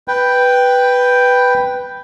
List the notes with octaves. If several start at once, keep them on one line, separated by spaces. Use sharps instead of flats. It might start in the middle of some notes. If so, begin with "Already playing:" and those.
B4 G5